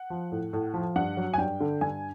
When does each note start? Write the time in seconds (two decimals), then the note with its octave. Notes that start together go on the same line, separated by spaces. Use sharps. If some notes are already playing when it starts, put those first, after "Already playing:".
Already playing: F#5
0.10 F3
0.32 A2
0.53 A2
0.74 F3
0.96 G2 F#5
1.17 F#3
1.34 G#5
1.38 G2 G5
1.60 D3
1.81 G2 G#5